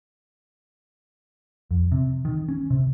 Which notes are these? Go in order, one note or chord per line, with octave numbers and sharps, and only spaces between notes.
F2
C3
D#3
C#4
C3